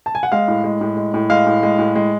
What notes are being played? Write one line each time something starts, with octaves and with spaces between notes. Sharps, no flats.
A5
G#5
F#5
G#3 F5
A2
G#3
A2
G#3
A2
G#3 F5
A2
G#3
A2
G#3